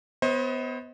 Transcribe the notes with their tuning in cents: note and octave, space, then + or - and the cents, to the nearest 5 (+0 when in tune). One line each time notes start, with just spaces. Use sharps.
B3 +15 C5 +35 D#5 +35